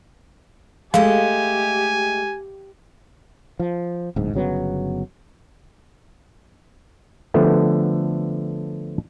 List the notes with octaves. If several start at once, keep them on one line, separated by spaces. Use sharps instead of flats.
G#3 A3 G4 D#5 F5 G#5
F3
D1 G#2
G1 C#3 F#3 B3
D3 F3 A3 B3